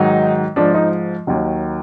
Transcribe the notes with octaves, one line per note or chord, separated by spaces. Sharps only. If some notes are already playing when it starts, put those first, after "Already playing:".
Already playing: G#2 D#3 F#3 D#4
G#2 F3 D4
D#4
D#2 D#3 F#3